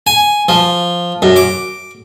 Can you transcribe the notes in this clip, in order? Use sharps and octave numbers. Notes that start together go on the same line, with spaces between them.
G#5
F3
F#2
D6